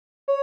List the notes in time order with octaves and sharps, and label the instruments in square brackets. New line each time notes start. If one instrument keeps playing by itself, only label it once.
[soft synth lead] C#5